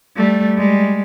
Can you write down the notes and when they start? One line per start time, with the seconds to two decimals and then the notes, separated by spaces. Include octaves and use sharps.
0.16 G3 A3
0.57 G3 G#3